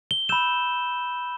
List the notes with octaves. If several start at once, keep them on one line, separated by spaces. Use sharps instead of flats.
G7
B5 E6 G6 E7